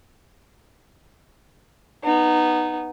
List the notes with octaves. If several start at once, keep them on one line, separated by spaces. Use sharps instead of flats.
B3 D#4